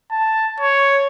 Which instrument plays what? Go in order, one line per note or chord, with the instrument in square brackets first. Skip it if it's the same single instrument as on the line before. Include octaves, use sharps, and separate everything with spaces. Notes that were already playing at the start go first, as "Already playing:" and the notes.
[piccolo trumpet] A5
C#5